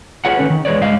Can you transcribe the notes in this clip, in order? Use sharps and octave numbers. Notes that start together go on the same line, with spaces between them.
F4 G4 G#4 B4 C#5 F#5
D#3 F#3 A3 C#4 A4 B4
D#3
E2 G#3 B4 C#5 D5
G2 G#3 G4 D#5 F5